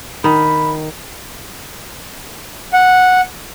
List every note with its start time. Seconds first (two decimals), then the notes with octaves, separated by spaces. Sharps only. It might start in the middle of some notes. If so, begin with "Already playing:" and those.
0.24 D#3 B5
2.73 F#5